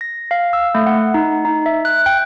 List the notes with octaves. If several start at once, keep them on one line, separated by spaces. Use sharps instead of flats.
A#6
F5
E6
A3
F#5
D#4
D#4
E5
F#6
G5